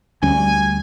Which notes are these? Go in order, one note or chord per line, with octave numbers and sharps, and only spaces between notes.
D2 G3 C#4 G#5